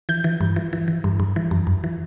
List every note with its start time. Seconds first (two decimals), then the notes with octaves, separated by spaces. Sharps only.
0.09 E3 G6
0.24 E3
0.41 G2
0.56 E3
0.73 E3
0.88 E3
1.04 G2
1.20 G2
1.36 E3
1.51 F#2
1.67 F#2
1.84 E3